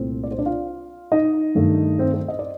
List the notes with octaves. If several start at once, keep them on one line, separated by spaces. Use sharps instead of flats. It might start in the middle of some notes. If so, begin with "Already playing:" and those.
Already playing: C2 A#2 A3 C4 C5
D5
C5
D4 D5
F4 F5
D#4 D#5
G2 D#3 A3
C4 C5
C4 C5
D#5
D5